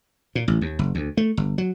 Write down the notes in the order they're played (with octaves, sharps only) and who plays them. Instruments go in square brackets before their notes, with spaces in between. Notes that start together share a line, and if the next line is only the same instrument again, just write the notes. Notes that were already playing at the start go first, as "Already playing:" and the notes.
[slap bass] A#2
A1
D#2
F#1
D2
A3
G1
F#3